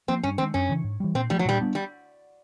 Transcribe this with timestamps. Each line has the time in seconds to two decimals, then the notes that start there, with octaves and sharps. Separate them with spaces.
0.08 F3 A#3 C4
0.23 G2 C#4
0.38 D#3 G#3 C4
0.54 F#2 C#4
0.69 C#3 E3
0.84 G#2
1.00 E3 G3
1.15 A#2 C4
1.30 F3 G3 A3
1.39 F#3
1.45 A#2 G3
1.61 G3 B3 D4
1.75 G3